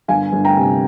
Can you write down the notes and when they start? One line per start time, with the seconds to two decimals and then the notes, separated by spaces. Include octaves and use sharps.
0.08 G1 F5 G#5
0.32 G1
0.45 G5 A#5
0.56 C3